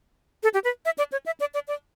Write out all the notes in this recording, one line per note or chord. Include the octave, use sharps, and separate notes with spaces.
A4
G4
B4
E5
D5
C#5
E5
D5
D5
D5